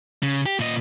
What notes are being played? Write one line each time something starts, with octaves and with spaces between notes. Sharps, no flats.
C#3
G4
A#2 D#5